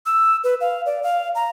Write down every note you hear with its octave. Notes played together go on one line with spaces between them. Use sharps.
E6
B4
F5
D5
F5
A#5